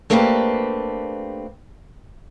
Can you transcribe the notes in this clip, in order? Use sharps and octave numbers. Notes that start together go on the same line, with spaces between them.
A3 A#3 C4 D4 G4 B4